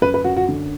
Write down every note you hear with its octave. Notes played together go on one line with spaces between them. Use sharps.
F#2 B4
B4
F#2 F#4
F#4
D3